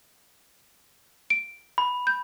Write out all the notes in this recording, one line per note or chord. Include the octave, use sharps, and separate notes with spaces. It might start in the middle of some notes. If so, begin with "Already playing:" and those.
D7
B5
G6